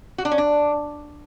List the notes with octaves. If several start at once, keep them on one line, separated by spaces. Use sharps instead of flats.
F#4
D4
C#4
D4